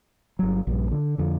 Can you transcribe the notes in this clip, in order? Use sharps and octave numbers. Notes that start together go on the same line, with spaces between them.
G1 F#3
A#1 G2
D3
F2 D3